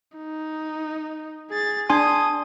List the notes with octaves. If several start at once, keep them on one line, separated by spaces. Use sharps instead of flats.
D#4
G#4 A6
D4 G#5 C6 D#6